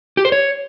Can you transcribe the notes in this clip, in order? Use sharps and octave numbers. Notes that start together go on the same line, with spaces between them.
G4
C5
C#5